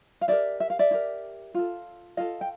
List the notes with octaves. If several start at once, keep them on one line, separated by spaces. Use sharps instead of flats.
F5
E4 G4 A#4 D5 E5
E5
F5
D5 E5
E4 G4 A#4
F4 A4
F4 A4 D#5 F5
G5